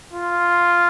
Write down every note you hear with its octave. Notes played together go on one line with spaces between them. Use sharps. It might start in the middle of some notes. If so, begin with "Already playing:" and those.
F4